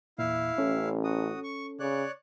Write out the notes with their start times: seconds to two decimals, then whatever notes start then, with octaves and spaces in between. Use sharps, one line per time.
0.19 E2 A#2 E4 F5
0.58 A1 C#4 A4
1.04 F#4 D#6
1.43 C#6
1.80 C#3 C#5 D5 F#6